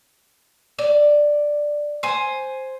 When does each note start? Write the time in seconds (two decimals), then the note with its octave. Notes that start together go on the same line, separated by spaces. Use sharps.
0.79 D5
2.03 C5 G#5